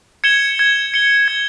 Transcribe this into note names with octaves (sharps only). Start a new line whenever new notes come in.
G#6 C#7 E7 G7
G#6
C#7 G7
G#6